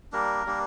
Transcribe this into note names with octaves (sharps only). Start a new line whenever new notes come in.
G3 A#3 D4 A#4
G3 A#3 D4